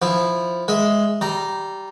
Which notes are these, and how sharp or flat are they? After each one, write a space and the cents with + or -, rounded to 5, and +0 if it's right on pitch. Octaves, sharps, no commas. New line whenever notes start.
F3 +0 E4 +0
G#3 +0 E5 +0
G3 -15 A#5 +0